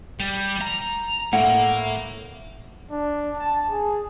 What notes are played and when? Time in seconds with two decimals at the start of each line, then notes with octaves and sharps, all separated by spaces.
0.20 G3
0.61 A#5
1.33 A2 A#3 F#5
2.91 D4
3.37 A5
3.69 G#4